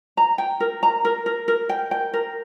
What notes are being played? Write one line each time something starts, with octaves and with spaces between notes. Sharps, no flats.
A#5
G5
A#4
A#5
A#4
A#4
A#4
G5
G5
A#4